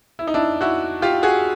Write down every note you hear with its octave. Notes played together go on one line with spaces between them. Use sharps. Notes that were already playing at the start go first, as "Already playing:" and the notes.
E4
D#4
D4 E4
E4 F#4
F4 G4
F#4 G#4